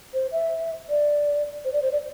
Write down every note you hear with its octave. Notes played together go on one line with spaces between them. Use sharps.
C5
E5
D5
C5
D5
C5
D5